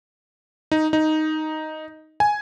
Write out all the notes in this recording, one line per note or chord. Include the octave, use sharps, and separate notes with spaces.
D#4
D#4
G#5